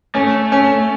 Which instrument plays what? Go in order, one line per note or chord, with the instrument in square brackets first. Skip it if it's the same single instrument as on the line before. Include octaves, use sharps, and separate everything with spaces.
[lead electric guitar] A3 [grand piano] C#4
[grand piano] C#4